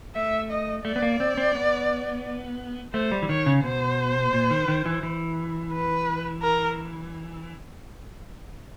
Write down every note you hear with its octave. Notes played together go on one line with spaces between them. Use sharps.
A3 E5
D#5
A3 D5
B3
A#3
C4
C4
B3
A3 C5
G3
E3
D#3 C#5
C#3
B2 C5
A#2
D#3
D#3
E3
E3
B4
A#4